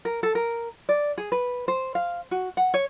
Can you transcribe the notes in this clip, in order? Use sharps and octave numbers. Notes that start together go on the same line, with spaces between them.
A#4
A4
A#4
D5
G#4
B4
C5
F5
F#4
F#5
C#5